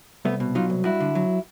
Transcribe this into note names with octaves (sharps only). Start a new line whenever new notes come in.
C2 A3 B3
B2
F#3 D#4 F4
C2
G2 E4 F#4
D3
F#3